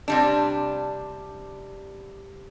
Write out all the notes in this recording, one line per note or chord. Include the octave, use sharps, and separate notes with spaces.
C3 G3 D4